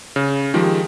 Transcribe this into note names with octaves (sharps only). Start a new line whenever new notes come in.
C#3
D#3 F3 G#3 G4